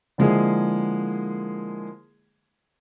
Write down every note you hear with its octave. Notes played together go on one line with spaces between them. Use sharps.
D3 F3 G#3 A#3 E4 G#4